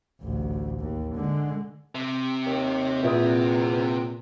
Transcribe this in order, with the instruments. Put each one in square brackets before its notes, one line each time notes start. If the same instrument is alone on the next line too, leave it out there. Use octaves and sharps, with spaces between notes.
[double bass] A1 D2
D#2
D3 G#3
[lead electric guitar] C3
[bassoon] D#2
[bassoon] E2 [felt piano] A#2 E5 D#6